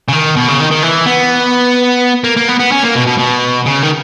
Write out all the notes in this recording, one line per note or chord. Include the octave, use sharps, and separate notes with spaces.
C#3
D#3
B2
C#3
D#3
D#3
E3
B3
A#3
A#3
B3
B3
C#4
A#3
B2
B2
B2
C#3
D#3